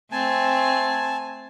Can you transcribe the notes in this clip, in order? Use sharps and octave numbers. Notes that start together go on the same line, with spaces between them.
A3 C4 G#5 A5